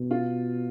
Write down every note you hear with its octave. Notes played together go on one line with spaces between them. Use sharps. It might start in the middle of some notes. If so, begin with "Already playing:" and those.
Already playing: B2
F4